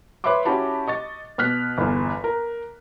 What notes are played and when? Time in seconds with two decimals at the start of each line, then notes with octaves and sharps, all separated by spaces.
0.24 B4 C#5 E5 B5 C6 D6
0.45 C#4 E4 F#4 G4 A5 B5
0.88 D#5 C#6 A6
1.38 B2 F6 F#6 B6
1.78 G1 E2
2.24 A#4